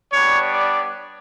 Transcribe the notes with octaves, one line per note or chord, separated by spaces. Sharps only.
G3 B3 D4 C#5
D5